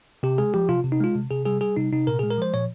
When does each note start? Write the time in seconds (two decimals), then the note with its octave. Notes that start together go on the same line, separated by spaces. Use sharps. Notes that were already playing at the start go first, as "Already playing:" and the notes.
0.23 C3 G4
0.38 G#3 G#4
0.54 F3 G4
0.69 C3 F4
0.84 C3
0.92 D#4
1.01 G#3 F4
1.15 C3
1.30 C3 G#4
1.46 G3 G#4
1.61 G3 G#4
1.77 C3 D#4
1.92 C3 D#4
2.07 A#2 A#4
2.19 G#3 G#4
2.30 A#4
2.38 F3 C5
2.54 A#2 C#5